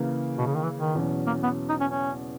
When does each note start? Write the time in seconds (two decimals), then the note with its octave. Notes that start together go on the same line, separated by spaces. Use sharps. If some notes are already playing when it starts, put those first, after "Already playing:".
Already playing: C#3 E3 A#3
0.38 B2
0.47 C#3
0.55 D#3
0.63 E3
0.80 D#3
0.95 E2 B2 F#3 C#4
1.27 A#3
1.43 B3
1.69 D#4
1.81 C#4
1.91 C#4